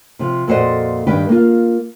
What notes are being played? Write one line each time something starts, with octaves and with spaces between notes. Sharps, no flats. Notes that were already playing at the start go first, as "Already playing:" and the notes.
C3 F3
F2 A#2 F#4 C5 D5 D#5
G2 D#3 D4 G4 B4
A#3 F4